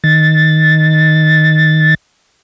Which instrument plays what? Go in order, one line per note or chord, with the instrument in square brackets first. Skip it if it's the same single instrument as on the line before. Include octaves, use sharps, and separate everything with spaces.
[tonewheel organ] D#3 A6